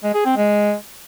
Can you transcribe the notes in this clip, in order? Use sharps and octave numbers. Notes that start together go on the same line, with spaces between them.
G#3
G#4
C4
G#3